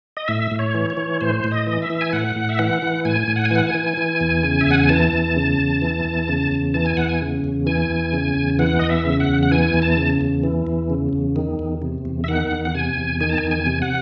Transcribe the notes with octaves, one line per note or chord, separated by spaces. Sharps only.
D#5
A2 E5
A2
C#5
E3
C#5
E3
A2 C5
A2
D#5
E3
E5
E3
G#5
A2 F#5
A2
E5
E3 F#5
E3
A2 G#5
A2
F#5
G#5
E3 F#5
G#5
E3
E3
E2
C#3
E5
E2 F#5
G#5
E3 A5
E2
C#3
E2
E3
E2
C#3
E2
E3 A5
G#5
E2 F#5
G#5
C#3
E2
E3 G#5
E2
C#3
E2
E3 F#5
E2 D#5
E5
C#3
F#5
E2
F#5
E3 G#5
E2
A5
C#3
E2
E3
E2
C#3
E2
D#3
E2
C3
E2
E5
D#3 F#5
E2
F#5
C3 G#5
E2
D#3 G#5
A5
G#5
E2
G#5
C3
F#5